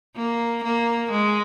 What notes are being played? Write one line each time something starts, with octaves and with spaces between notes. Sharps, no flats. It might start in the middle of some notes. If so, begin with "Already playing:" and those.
A#3
A#3
G#3